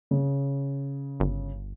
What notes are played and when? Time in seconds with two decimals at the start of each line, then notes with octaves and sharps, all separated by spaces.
0.11 C#3
1.20 G1